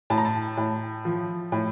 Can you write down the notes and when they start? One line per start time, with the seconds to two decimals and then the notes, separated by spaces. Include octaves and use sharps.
0.10 A2 A5
0.18 A#5
0.25 A5
0.57 A2
1.05 F3
1.52 A2